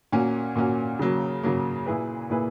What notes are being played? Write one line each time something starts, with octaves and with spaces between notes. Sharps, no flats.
A#2 A#3 C#4 F#4
A#2 A#3 C#4 F#4
C#3 F#3 A#3
C#3 F#3 A#3
A#2 A#3 E4 G#4 B4
A#2 A#3 E4 G#4 B4